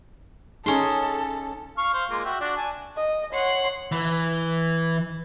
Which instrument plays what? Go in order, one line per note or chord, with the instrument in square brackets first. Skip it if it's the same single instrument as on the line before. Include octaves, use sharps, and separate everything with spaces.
[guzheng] C#4 C6 [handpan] D#4 G#4 [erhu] A4
[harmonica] F5 C#6 F6
C5 F5
G#3 A#3 F4
F#4 E5 G5
D4 F#4
G#5 A5
[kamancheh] D#5
[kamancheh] C#5 C6 [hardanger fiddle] F#5
[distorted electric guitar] E3